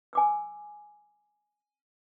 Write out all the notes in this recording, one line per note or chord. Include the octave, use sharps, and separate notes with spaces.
G#5 D6 E6